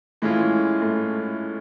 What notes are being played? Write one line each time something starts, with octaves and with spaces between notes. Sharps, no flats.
A2 E3 G#3 A3 C#4 F4
A2 A3